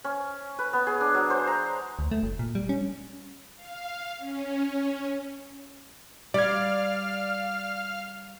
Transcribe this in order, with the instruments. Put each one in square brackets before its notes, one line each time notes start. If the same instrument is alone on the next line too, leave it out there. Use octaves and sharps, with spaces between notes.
[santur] C#4
B4
B3
G#4
D4
F#3
C5
A#5
[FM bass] D2
A3
F#1
A#2
G3
C#4
[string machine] F5
C#4
[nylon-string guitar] G3 [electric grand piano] D5 G#6 [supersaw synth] F5 F6